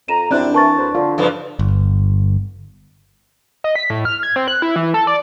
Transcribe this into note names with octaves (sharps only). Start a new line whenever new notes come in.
F2 A#5 D#7 E7
F#2 C3 C4 D4 E4 C5 D5 F#6
E3 A#4 A5 C#6 A6
D2 B4 C5
D3 F4
G2 C#3 F3 A4 B4 D5
G1
D#5
B6
A2
F6
G#6
C4
F#6
E4
E3
A4
D5